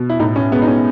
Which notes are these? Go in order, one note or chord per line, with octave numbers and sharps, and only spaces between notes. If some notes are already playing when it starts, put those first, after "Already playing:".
Already playing: B2
E4
A2 D#4
C#4
G#3 B3
D#4
C#4